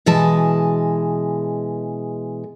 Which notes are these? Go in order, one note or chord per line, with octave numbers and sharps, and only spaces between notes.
B2 E3 G#3 G#4 A5